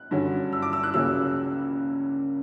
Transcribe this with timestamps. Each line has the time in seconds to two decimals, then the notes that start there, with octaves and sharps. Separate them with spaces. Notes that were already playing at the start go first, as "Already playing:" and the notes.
Already playing: F#6
0.11 G2 D3 F#3 C#4
0.53 E6
0.62 D6
0.73 E6
0.83 F#6
0.94 C#2 C#3 F#3 A#3 C#4 E6